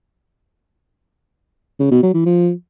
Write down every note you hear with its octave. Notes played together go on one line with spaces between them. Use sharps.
C#3
B2
F#3
E3
F3